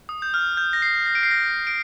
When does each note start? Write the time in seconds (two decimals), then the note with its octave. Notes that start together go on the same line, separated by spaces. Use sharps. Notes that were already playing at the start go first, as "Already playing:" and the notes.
0.09 D#6
0.22 G6
0.34 F6
0.57 G6
0.73 A#6
0.82 C7
1.06 A#6
1.15 D7
1.23 C7
1.31 A#6
1.67 D7